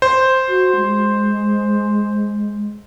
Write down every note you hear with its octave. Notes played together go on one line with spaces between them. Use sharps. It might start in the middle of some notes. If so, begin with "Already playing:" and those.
C5
F#4
G#3